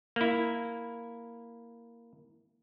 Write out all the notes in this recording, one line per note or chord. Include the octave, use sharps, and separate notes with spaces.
A#3 E4